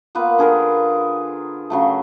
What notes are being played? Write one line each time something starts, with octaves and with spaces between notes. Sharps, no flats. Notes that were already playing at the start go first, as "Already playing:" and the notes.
A#3 B3 F4 B4
D3 G#4 A#4 B4
C#3 F#3 A3